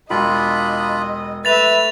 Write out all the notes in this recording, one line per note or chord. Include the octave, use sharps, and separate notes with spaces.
E1 D4 F4 D#5 B5 C6
A3 B4 E5 A6 F7